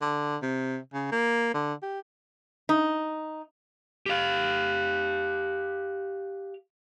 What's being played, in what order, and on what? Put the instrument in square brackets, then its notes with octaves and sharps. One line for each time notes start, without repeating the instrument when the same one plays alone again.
[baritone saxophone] D3
C3
C#3
A#3
D3
G4
[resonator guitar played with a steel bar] D#4
[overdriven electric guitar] G4 F5